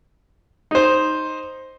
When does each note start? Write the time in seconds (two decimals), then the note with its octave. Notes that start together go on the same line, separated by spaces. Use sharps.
0.71 D#4 C5